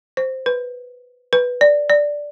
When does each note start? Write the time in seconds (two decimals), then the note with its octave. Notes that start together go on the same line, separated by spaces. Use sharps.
0.17 C5
0.46 B4
1.33 B4
1.61 D5
1.89 D5